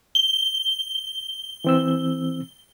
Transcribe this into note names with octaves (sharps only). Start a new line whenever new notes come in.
G7
E3 C4 E6